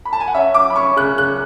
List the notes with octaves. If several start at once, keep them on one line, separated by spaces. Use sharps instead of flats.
B5
A5
G#5
F#5
C#4 E5
C#4 D6
B5
C#4 C#6
C#3 F#6
C#3 F#6